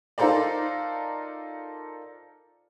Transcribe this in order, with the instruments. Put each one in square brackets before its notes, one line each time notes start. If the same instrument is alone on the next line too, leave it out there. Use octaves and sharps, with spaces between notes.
[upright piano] D#4 F4 A4 A#4 C5 D5